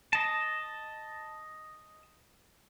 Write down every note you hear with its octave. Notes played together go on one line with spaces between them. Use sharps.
D#5 A5